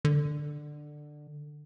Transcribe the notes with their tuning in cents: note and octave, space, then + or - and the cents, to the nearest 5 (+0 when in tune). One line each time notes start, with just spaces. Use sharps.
D3 +15